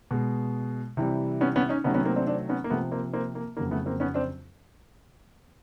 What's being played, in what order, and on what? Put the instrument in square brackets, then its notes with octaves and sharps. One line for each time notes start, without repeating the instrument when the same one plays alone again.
[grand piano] B2 G#3
C3 E3 G3
B3 C#4
B3 C#4
C#4 D#4
C3 D#3 F#3 A3 B3 C#4
B3 C#4
A#3 C4
C4 D4
C4 D4
B3 C#4
A#3
C3 F3 A3 B3
A#3 C4
A#3 C4
A#3
F2 C#3 F#3 A#3
A3 B3
A#3 C4
B3 C#4
C4 D4